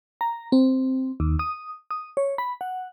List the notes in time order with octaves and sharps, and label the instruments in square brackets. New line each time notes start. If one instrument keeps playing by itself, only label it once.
[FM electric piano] A#5
C4
D#2
D#6
D#6
C#5
B5
F#5